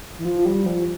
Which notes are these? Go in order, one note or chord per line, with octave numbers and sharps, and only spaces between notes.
E3
F3
G3
F3